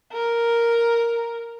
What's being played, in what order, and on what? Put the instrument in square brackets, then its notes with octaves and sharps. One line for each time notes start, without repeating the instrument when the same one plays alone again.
[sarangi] A#4